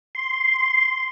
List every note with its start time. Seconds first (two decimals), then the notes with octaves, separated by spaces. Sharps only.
0.15 C6